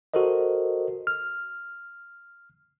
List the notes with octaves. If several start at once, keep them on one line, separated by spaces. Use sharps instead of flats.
F#4 A4 A#4 C5 D#5
F6